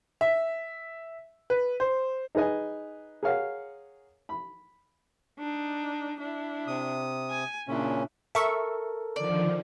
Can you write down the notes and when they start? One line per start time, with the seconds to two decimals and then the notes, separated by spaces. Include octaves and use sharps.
0.21 E5
1.50 B4
1.80 C5
2.35 D#4 G#4 B4 D#5 G#5
3.23 G#4 A#4 C#5 F5 F#5
4.29 B5
5.39 D4 D#4
6.19 D4 E4
6.67 C3 D#6
7.30 G#5
7.68 A#2 C#3 C#4 D4 E4
8.35 A4 A#4 E5 C#6
9.16 D3 D#3 F3 D5